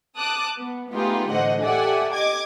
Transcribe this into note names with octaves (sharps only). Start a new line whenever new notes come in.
A5 D6 D#6 F#6
B3
A3 B3 D#4 F4 G4 G#4
A1 D3 A3 C5 D#5 F#5
G4 A4 D5 E5 F#5 G#5
D#5 D6 G#6